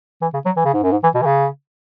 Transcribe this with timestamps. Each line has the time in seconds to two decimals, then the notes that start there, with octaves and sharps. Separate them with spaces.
0.22 E3
0.34 C#3
0.46 F#3
0.57 E3
0.65 C#3
0.74 G#2
0.83 F#2
0.91 G#2
1.03 E3
1.15 B2
1.22 E3
1.26 C#3